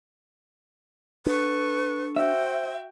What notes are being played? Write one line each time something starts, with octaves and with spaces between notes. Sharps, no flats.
D4 A4 B4 C#6
F#4 C5 E5 G5